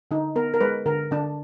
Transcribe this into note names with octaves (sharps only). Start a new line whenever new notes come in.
D3 D#4
B3 A#4
A#4
G#3 B4
D3 A#4
D3 D4